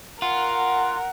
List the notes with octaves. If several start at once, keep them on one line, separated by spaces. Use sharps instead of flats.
F4 A#4 F#5